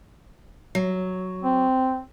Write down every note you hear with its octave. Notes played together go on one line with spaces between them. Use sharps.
F#3
C4